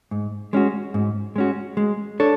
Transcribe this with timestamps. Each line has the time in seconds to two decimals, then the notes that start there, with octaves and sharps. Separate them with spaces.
0.11 G#2
0.53 G#3 C#4 F#4
0.94 G#2
1.36 G#3 C#4 F#4
1.77 G#3
2.20 D4 A4 C#5